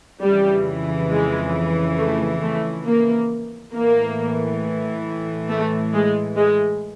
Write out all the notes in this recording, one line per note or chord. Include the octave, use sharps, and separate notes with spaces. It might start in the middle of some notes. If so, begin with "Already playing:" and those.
F2 C#3 E3 G3
G#3
A3
A3
A#3
A2 E3 A#3
A3
G#3
G#3